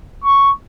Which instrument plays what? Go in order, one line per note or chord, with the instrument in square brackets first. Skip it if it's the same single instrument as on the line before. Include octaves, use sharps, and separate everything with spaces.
[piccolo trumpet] C#6